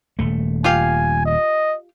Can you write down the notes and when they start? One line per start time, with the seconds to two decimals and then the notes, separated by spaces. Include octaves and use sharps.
0.19 D#1 A3
0.64 F4 G4 F5 G#5
1.25 D#5